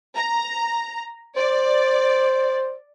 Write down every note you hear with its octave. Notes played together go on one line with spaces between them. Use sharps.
A#5
C5 D5